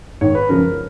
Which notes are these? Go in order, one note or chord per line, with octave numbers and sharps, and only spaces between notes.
G#2 D#3 C#5
B4
F#2 C#3 F3 A#4